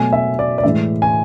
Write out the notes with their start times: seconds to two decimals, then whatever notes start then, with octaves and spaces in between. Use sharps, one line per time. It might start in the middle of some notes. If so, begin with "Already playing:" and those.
Already playing: B2 F#3 A3 G#5
0.13 E5
0.39 D5
0.58 D5
0.64 A2 E3 G#3 E5
1.02 G#5